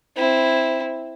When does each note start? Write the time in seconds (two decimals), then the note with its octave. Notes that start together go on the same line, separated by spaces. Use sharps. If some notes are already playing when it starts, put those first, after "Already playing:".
0.17 C4 E4